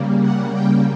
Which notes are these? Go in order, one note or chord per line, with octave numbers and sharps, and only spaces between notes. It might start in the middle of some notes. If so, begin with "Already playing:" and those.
Already playing: C#3 G3 A#3
F#5
G5